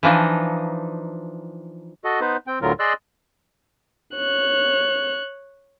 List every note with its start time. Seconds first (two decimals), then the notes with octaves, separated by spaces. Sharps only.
0.03 E3 F3 D4 D#4
2.04 F#4 A4 D#5
2.21 B3 D#4 B4 C5
2.47 C4 G5
2.62 D2 A2 D3 F#3 F4 A#4
2.79 G#4 D5 D#5 C6 E6 F#6
4.16 C#5 F#6